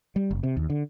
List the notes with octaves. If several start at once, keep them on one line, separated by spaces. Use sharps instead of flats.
G3
F#1
C3
D#2
D3